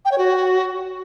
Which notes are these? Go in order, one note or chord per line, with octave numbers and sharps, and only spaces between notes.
G5
C#5
F#4